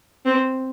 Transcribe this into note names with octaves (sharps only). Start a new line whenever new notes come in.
C4